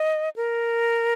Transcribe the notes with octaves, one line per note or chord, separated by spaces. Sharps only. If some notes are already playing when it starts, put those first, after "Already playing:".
Already playing: D#5
A#4